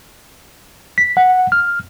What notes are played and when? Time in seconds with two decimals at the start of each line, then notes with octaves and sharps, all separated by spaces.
0.98 B6
1.17 F#5
1.52 F6